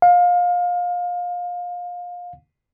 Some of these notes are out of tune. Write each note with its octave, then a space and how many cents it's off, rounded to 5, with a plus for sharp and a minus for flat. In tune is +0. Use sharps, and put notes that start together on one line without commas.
F5 +25